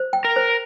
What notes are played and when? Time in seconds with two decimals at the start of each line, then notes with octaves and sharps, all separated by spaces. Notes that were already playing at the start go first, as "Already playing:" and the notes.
Already playing: C5
0.13 G5
0.25 A#4
0.36 C5